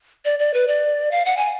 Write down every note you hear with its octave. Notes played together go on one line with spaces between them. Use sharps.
D5
D5
B4
D5
F5
F#5
G#5